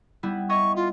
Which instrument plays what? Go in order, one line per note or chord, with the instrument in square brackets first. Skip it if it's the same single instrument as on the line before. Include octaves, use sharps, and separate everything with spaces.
[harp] G3 B3 E4
[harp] C#5 D#5 E5 [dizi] C#6
[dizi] F4